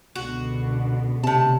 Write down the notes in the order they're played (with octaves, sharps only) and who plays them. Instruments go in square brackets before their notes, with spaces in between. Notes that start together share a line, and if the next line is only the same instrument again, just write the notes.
[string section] C#2 B2 D3 [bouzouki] F#4
[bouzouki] A2 A5 [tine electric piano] C3